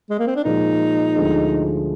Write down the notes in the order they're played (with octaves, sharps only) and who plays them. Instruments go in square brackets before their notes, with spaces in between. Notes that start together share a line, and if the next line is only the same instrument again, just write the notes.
[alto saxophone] G#3
A#3
C4
D4
[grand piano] A#2 F3 G#3 [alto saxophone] D#4
[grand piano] D2 D3 F3 G#3